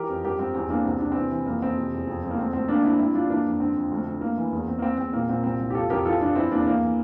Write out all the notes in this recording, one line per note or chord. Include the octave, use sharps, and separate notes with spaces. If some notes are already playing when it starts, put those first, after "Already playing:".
Already playing: E3 G4 A#4
F2
G2 G4 A#4
G2 C4
E2 C4
E3 A#3 D4
C2 C4
C3 D4
E3 C4
E3
F2 A#3
F2 C4
C3
E2
F2
F2
A#3
D2 C4
D2 C4
D3 A#3 D4
D3 C4 E4
G2 C4 E4
G2 D4 F4
E3 A#3 D4
F2
D3 C4
F2
D2
D3
D2 A#3
E3
E2 A#3
E2 C4
A#3
E3 C4
E2 C4
A#2 A#3
A#2 C4
C2 C4
C2
G4
F2 F4 A4
F2 G4 A#4
E3 F4 A4
G2 D4 F4
E3 C4 E4
E2 A#3 D4
E3 A#3
E3